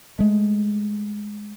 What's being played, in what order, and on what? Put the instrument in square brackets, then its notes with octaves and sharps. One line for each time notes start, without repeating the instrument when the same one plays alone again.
[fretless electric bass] G#3 A3